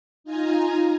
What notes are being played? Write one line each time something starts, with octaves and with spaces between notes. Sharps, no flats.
D#4 F4 G#5 A#5